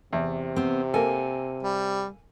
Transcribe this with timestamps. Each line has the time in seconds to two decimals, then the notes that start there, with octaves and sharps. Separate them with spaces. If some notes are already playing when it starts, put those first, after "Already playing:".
0.13 E2 C3
0.56 B3 C4
0.94 A#3 A4 G#5
1.63 G3